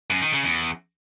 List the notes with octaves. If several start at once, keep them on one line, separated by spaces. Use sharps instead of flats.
F#2
D#3
C#3
E2